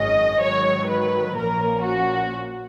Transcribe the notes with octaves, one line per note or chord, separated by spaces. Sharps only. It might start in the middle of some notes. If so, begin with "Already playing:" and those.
Already playing: G#1 F#2 D#3 G#3 C#4 D#5
G#2 D#3 F#3 C#5
B4
A#1 A#2 F3 A#3 C#4 A#4
F#4